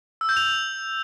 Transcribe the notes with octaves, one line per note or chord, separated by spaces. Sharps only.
E6
G6
F7